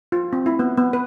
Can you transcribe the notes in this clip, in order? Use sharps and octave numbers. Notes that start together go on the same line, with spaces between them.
F4
C4
E4
B3
B3
B4